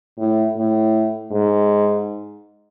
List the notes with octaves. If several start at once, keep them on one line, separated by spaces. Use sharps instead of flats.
A2
A2
G#2